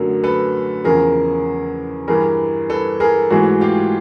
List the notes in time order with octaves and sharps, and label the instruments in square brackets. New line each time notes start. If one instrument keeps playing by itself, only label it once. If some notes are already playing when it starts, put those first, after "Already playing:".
Already playing: [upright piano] F#2 D3 F#3 A3 A#4
A4 B4
E2 C#3 F3 G#4 A#4
G2 E3 G3 G#4 A#4
A4 B4
G#4 A#4
G#2 E3 A3 F#4 G#4
F4 G4